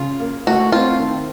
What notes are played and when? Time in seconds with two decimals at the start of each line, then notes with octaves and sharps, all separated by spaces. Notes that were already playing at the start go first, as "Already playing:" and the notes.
Already playing: C#3 F4
0.20 A#3
0.47 A3 F#4
0.72 C4 F4
0.99 D#3